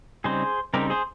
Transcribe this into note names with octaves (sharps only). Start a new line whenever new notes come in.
C#3 G3 C4 D#4 G#4 C5
C#3 G3 C4 D#4 G4 A#4
G#4 C5